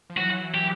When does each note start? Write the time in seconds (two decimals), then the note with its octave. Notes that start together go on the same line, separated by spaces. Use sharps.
0.10 F3
0.17 E3 F#3 F#4
0.54 G4